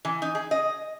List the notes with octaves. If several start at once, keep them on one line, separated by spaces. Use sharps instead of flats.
E3
D#4
G#4
D#5